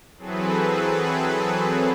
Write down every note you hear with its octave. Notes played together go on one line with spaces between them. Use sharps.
E3 F#3 C4 G#4 A4 B4